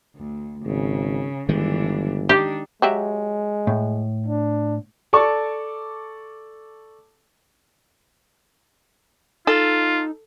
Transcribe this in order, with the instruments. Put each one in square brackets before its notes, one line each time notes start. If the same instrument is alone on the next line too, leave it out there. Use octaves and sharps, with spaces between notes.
[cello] D2
[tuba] G#1 [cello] C#3
[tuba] G1 [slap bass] D#3 G#3 [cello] E3 D4
[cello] D4 D#4 [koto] G4
[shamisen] F#3 G4 E5 [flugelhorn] G#3
[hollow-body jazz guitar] A2
[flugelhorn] D4
[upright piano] A4 D5 A5 C#6 D6
[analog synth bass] D#4 [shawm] F4 [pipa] A4